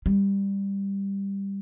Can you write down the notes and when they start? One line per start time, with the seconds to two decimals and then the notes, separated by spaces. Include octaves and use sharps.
0.06 G3